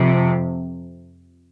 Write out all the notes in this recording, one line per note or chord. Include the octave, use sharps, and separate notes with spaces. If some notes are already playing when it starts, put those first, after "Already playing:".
Already playing: F2 C3